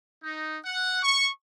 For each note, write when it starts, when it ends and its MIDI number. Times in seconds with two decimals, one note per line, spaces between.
0.22 0.55 63
0.64 1.01 78
1.02 1.27 85